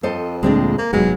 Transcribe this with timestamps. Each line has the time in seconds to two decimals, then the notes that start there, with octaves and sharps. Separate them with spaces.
0.03 F2 A4 C5 D#5
0.43 D2 A#2 G#3 C4 D4
0.78 A#3
0.93 F1 G#2 F#3 G#3 B3